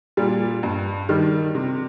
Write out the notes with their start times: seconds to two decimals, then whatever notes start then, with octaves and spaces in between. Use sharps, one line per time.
0.17 A#2 G3 D4
0.63 G2
1.09 D#3 G3 D4
1.55 C3